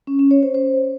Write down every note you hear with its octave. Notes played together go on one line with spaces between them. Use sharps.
C#4
C#4
C#5
C5
C5